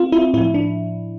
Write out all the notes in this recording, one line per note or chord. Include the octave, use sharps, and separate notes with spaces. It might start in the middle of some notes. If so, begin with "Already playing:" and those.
Already playing: C4 F4
E4
A2 F3 E4
D4